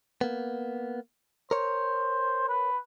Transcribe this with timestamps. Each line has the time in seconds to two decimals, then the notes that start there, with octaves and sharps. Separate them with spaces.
0.21 A#3 B3
1.51 A#4 C5 C#5
2.49 B4